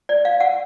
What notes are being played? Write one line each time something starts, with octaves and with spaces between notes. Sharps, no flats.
D5
F5
F#5